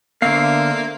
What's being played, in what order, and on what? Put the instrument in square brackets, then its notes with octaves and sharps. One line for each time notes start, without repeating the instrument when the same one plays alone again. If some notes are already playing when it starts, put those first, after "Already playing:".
[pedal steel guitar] D3 F5 [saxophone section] A#3 C5 E5 [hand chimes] B3